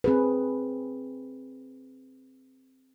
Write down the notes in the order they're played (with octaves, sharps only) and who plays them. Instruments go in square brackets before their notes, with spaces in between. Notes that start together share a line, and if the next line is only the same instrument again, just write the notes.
[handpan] C4 G#4 B4